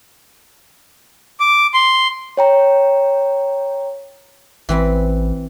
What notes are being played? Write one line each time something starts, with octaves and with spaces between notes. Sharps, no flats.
D6
C6
C#5 G5 A#5
A1 E3 C4 B5